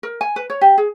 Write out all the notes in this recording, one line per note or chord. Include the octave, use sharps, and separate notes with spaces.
A#4
G#5
B4
C#5
G4
G#4